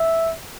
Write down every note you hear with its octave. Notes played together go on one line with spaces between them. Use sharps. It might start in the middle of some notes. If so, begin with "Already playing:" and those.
Already playing: E5